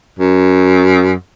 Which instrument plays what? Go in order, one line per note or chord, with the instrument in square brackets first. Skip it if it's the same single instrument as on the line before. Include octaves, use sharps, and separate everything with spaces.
[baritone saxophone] F#2